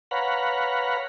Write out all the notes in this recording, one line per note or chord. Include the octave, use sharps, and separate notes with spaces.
B4 C#5 F5 F#5 A#5 B5